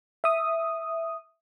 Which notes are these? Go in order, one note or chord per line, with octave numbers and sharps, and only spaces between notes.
E5 D#6